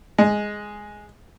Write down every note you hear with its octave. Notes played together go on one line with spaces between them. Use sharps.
G#3